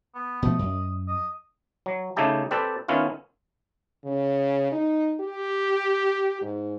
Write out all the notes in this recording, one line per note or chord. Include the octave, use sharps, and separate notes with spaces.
B3
B2 F3 A3 D#5
F#2
D#5
F#3
C#3 A3 D#4 E4 G4 A5
C4 G4 A4 B4 D5
D#3 B3 C#4 E4 F4
C#3
D#4
G4
G#2